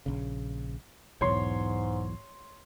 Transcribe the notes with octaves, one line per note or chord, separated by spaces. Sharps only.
A#1 C#3
B1 E2 G#2 C#5 C6